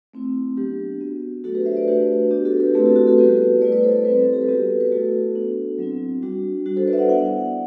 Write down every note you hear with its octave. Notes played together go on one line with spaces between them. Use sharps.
A3 C4 E4
F#3 B3 D4 G4
B3 F#4
F#3 A3 D4 F#4 A4
G4 B4
C5 E5
B4 D5
A3 D4 F#4 G4 B4
B3 D4 F#4 G4
F#4 A4
G4 B4
A3 C4 E4 G4 B4
F#4 A4
F#4
F#4 A4
G3 B3 E4 G4 B4
A3 E4 B4 D5
B4 D5
A4 C5
G3 C4 E4 B4
A4
G4 B4
A4
B3 F#4 G4 B4
B4
A3 E4 F#4 A4
B3 D4 F#4
F#3 C4 E4
G3 D4 F#4
G3 D4 F#4
A4 C5
B4 D5
E5
D5 F#5
B3 E4 D5 F#5